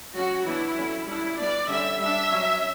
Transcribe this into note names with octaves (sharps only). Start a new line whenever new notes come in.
F#3 C#4 F#4
E3 B3 D4 E4
D3 F#3 C#4
G3 D4 E4
G3 B3 D4 D5
D3 G3 C#4 E5
G3 D4 E5
F#3 C#4